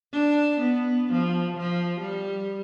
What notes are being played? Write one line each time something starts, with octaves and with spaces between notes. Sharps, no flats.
D4
B3
F3
F3
G3